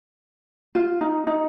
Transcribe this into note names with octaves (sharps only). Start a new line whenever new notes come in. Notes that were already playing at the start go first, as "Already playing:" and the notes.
F4
D#4
D#4